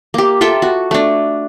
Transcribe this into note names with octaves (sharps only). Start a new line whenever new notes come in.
A#3 G4
F4 A4 E5 G5
F#4
A3 D4